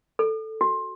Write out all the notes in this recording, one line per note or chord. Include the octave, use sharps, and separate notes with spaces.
A4
F#4